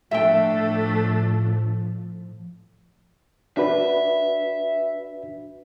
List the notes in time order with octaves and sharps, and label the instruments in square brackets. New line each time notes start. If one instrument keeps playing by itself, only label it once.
[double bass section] A2 F3 [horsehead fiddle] A3 D4 [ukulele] E5 G5
[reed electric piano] D4 F#4 B4 [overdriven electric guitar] E5